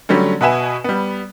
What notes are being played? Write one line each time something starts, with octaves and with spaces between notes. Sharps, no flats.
D3 F#3 G3 A3 C#4
B2 F#4 B4 E5 G#5 E7
G3 B3